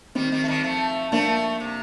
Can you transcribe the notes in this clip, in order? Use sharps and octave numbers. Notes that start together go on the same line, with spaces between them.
D#3 G3 C4
D#3 G3
A3
D#3 G3
F3 A3
F3 A3 A#3 D4
C3